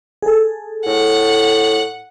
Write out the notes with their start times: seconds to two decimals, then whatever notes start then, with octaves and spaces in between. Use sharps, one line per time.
0.22 G#4 A4
0.86 A2 F#5